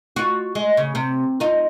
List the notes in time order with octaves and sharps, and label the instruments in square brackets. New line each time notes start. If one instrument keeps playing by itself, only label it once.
[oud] F4 F#4
G#3
C#3
C3
D#4 F4